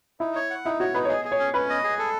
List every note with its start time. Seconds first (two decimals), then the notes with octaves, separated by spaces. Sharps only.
0.20 D#4 E4
0.35 C#5
0.50 F#5
0.65 D#4 E4
0.80 F#4 C#5
0.94 D#4 B4
1.05 C#5
1.09 G#4 D#5
1.25 G#4
1.32 C#5
1.39 C#4
1.53 C#4 B4
1.70 D#5
1.84 G#4
1.99 A4